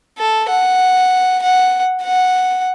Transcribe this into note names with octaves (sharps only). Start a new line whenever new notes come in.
A4
F#5
F#5
F#5